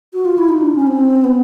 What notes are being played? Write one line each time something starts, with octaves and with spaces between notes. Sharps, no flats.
F#4
F4
E4
D#4
D4
C#4
C4
B3